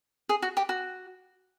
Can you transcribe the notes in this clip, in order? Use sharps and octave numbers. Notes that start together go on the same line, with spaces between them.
G#4
F#4
G4
F#4